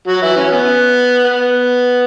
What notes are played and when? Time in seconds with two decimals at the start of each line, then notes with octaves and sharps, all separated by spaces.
0.07 F#3 F#4
0.22 E3 E4
0.36 C#4
0.51 B3
1.24 B3